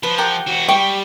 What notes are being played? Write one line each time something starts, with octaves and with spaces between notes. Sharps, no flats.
F3 B4
G4 A#4 F#5
E3 F#4
G3 G5 C#6